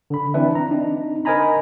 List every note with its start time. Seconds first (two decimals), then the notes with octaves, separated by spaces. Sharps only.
0.10 D3 B5
0.34 E3 C4 D4 B4 E5
0.55 A#5
0.71 C4 D4 D#4
1.25 A#4 C5 D#5 G#5 A#5 B5